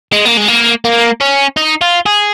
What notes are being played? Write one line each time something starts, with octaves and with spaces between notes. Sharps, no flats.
G#3
A#3
G#3
A#3
A#3
C#4
D#4
F4
G#4